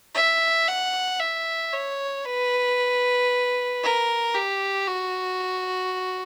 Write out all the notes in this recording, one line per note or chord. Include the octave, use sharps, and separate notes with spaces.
E5
F#5
E5
C#5
B4
A#4
G4
F#4